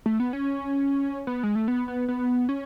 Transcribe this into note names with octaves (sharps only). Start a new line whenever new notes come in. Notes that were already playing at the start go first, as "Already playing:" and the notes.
A3
B3
C#4
B3
G#3
A3
B3
B3
B3
C#4